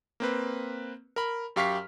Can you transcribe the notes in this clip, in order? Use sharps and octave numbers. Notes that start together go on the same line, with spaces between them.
A#3 C4 B4
A#4 B5
F#2 G4 F5 C#6 F6 B6